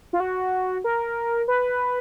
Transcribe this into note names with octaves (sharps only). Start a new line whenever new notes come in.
F4
F#4
A#4
B4